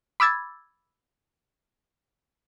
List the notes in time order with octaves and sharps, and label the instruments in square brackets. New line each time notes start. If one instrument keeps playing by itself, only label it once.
[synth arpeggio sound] B5 D6 E6 G#6 A6